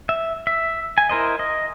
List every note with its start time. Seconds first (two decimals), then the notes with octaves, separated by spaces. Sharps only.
0.09 E5
0.47 E5
0.98 G#5
1.09 E4 A#4 C5 D#5
1.39 D#5